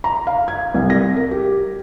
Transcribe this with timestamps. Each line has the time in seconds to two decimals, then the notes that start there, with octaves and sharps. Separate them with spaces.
0.04 A#5
0.27 F5
0.48 G#6
0.74 C2
0.90 A#6
1.16 A#4
1.31 G4